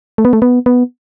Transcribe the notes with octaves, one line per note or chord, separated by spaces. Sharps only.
A3
B3
A3
B3
B3